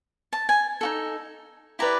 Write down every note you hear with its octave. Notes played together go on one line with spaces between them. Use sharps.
A5
G#5
D#4 F#4 A4
E4 G4 B4 D5 A#5